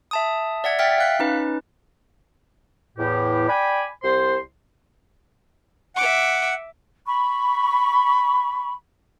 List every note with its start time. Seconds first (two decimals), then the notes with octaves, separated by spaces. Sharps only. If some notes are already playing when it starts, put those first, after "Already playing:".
0.11 E5 A5 D#6
0.64 D5 E5 F#5 G#6
0.79 E5 F#5 G5 F6 A6 B6
0.98 F5 F#6 B6
1.19 C#4 D#4 B4
2.98 E2 A2 G4
3.49 D5 G5 G#5 B5
4.03 C2 C5 C6
5.96 E5 F#5 D6
7.05 B5 C#6